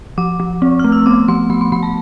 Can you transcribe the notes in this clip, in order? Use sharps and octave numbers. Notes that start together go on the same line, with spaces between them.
F3 D6
F3
C4
A3 F6
E6
B3 D6
F3 C6
F3 B5
C6
F3 B5
A5